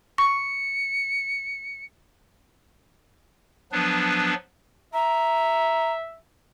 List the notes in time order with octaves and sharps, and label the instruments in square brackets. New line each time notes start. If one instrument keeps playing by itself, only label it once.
[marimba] C#6 [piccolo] C#7
[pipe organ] F3 F#3 B3 D4 B4
[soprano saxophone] E5 [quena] A#5